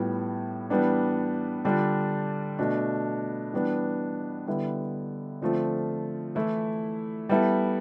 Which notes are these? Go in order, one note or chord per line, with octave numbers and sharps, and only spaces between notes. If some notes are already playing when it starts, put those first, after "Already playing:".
Already playing: A2 G3 B3 F4
E3 G3 B3 D4
D3 G3 D4 F4
B2 A3 D4
E3 G3 B3 D4
D3 G3 B3 E4
D3 F3 A3 C4 F4
E3 A3 E4
G3 B3 E4 A4